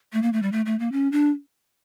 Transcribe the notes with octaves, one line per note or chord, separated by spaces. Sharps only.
A3
A#3
A3
G3
A3
A3
A#3
C#4
D4